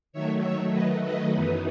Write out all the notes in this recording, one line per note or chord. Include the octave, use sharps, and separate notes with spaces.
D#3 F#3 A3 C#5 E5
C#5 E5
B4 D#5
B4 D#5
F#2 E3 B3 D#4